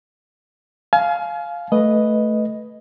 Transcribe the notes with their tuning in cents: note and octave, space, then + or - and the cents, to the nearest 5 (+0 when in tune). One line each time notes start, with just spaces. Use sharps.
F5 +0 G#5 +35
A3 +0 B4 +0 D#5 +0